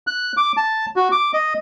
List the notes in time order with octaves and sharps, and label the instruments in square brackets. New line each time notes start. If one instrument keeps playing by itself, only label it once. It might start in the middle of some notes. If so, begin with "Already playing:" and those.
[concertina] F#6
D6
A5
F#4
D6
D#5